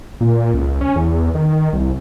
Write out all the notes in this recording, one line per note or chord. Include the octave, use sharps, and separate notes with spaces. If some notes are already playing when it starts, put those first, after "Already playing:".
A#2
C#2
C#4
E2
D#3
C2